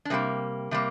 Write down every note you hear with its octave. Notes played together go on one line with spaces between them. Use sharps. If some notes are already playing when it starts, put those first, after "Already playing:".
D4
C3 G3 A#3 C4
C3 G3 A#3